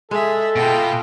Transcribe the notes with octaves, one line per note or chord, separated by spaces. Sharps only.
G#3 G#4 A4 E5
B2 F4 G5